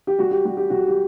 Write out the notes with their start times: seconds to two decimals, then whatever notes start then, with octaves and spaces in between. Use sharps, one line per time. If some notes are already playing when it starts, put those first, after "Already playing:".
0.07 G4
0.19 G3 F#4
0.31 G4
0.45 G3 F#4
0.57 G4
0.70 G3 F#4
0.88 G4